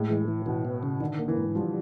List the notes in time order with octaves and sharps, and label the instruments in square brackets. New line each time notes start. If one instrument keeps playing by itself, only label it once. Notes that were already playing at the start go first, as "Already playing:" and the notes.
Already playing: [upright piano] A2 [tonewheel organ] G#3
[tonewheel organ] E3
E3
[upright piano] B2 [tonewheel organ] E3
[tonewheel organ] B3
C#3
[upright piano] D3 [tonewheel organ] D#3
[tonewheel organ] A#3
[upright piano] E3
[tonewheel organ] G#2
[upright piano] F3 [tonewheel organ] G3